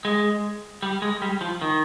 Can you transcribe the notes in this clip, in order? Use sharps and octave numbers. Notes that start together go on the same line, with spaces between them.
G#3
G3
G#3
G3
F3
D#3